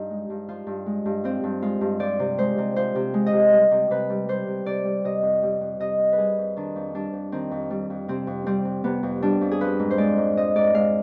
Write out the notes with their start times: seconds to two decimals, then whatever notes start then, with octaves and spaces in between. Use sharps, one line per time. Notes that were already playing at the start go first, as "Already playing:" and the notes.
Already playing: G2 F3 D#4
0.10 G#3
0.30 G2
0.48 F3 F4
0.67 G2
0.86 G#3
1.05 G2
1.24 F3 C4
1.44 G2
1.62 G#3 F4
1.81 G2
2.00 F3 D5
2.19 C3
2.38 G#3 C5
2.58 C3
2.76 F3 C5
2.95 C3
3.14 G#3
3.26 D#5
3.33 C3
3.52 G3
3.71 C3
3.91 C3 B4
4.10 G3
4.29 G3 C5
4.48 C3
4.66 C3 D5
4.85 G3
5.04 C3 D#5
5.23 F2
5.43 G3
5.61 F2
5.80 C3 D#5
5.99 F2
6.12 B4
6.18 G3 G#4
6.38 F2
6.56 D#3 D4
6.76 F2
6.94 G3 D4
7.13 F2
7.32 D#3 C4
7.51 F2
7.70 G3
7.90 F2
8.08 C3 C4
8.27 F2
8.46 G3 C4
8.65 F2
8.84 C3 B3
9.03 F2
9.22 G3 D4
9.41 F2
9.51 G#4
9.61 F3 B4
9.79 G#2
9.91 C5
9.98 G#3 D5
10.17 G#2
10.37 F3 D#5
10.56 G#2 D5
10.74 G#3 F5